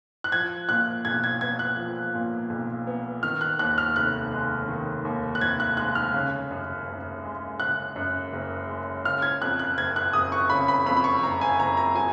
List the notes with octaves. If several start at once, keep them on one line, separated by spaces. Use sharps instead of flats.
F#6
F3 G#6
A#2 F#6
B1 G#6
G#6
B3 G#6
F#6
F3
A#2
B1
B3
D#3 F6
F#6
D#2 F#6
F6
F1 F#6
G#3
D#3
D#2
F#6
F1 G#6
F#6
G#3 F#6
F6
C#3
F#2
F#1
G#3
C#3 F#6
F#2
F#1
G#3
C#3 F6
G#6
F2 F#6
F#6
F#1 G#6
F#6
F#1 D#6
C#6
C#3 B5
B5
F2 B5
B5
C#6
F#1 A#5
G#5
F#1 A#5
A#5
F#3 G#5